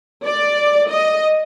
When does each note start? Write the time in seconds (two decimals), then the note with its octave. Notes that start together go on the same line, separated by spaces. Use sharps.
0.25 D5
0.90 D#5